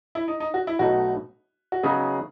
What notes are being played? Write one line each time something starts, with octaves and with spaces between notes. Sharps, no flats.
E4
D#4
D#4
F#4
E4
B1 B2 A3 D#4 F#4
F#4
C#3 F#3 B3 D#4 G#4